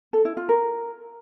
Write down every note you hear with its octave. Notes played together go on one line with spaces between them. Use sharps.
A4
E4
F4
A#4